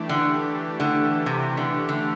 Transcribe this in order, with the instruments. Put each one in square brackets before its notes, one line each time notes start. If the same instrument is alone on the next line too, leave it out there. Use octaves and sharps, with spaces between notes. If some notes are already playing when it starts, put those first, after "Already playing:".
Already playing: [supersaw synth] E3 A3 D4 G4
[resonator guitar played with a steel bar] D3
D3
C3
D3
D3